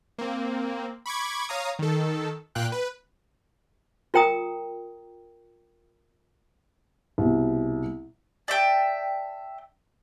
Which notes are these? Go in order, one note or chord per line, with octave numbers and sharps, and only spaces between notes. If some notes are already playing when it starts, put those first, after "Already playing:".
A#3 C4
B5 C#6 D6 G#6
C#5 F5 A#5 D#6
D#3 A4
A#2 F5 G5 F#6
B4
F4 A#4 G5 A#5 D#6
C2 B2
D5 E5 G5 A5